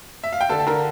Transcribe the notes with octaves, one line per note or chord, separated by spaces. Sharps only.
E5
F5
G5
D3 A4 A5
A5
D3 A#4 A#5